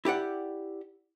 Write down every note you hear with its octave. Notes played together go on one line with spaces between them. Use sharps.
E4 G4 D5 F#5